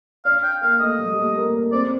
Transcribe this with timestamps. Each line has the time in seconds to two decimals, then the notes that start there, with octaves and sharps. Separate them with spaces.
0.25 D4 D5 F5
0.43 G5
0.61 A#3 A#4 F5
0.80 A3 A4 D#5
0.98 G3 G4
1.13 G4
1.16 A3 A4
1.36 A#3 A#4
1.54 A#3 A#4
1.72 C4 C5 D5